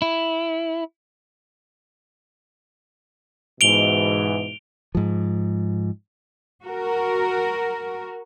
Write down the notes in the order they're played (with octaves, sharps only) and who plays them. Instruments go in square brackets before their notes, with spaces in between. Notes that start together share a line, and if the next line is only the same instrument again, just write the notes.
[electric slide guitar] E4
[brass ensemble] G#2 B2 E3 [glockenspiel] D7 F7 G7
[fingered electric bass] G#2 F3
[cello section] F#4 A#4